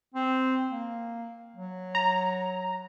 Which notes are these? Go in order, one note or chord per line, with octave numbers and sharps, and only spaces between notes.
C4
A#3
F#3
A#5